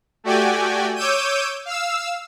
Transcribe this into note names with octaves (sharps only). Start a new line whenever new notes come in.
A3 F#4 G4 D5 G5 G#5
C#5 D6 E6 G6 D#7
F5 E6